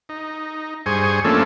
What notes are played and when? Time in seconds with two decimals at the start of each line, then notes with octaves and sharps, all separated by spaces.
0.09 D#4
0.86 G2 G#4 C5 G#5 C#6
1.25 F3 A3 A#3 C#4 D4 A4